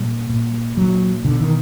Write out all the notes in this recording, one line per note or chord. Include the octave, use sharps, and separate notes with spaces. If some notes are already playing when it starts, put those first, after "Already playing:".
Already playing: A#2 G3
A#2
A#2 F#3
B2 D3
D#3